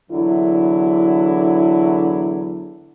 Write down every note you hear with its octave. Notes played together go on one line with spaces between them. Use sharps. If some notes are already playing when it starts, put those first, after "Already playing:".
E2 D3 F#3 E4